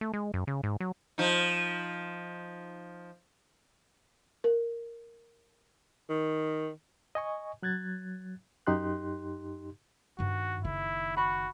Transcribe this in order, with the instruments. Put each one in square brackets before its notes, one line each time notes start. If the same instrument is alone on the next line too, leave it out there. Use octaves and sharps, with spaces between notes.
[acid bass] A3
G#3
F#2
C#3
G#2
F#3
[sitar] F3 D#4
[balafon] A#4
[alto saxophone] D#3
[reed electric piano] D#5 G#5 C#6
F#3 F#6 G#6 A6
F#2 D#4 G4 C6 F#6
[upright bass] G2 D#3 [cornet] F#4
[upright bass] F#1 D#3 [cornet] E4
[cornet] F#4 [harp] B5 C#6